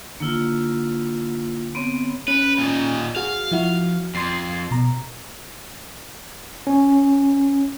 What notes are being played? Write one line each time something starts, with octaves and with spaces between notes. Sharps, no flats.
D3 A#3 E4 F4
B3 C4 C#5
C#4 B4
A#2 D#4
F#4 G#4 F5
F3 E4 F#4
F2 C6 A6 C7
B2 A#5
C#4